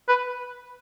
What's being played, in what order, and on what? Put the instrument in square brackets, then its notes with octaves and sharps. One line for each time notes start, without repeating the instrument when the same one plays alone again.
[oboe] B4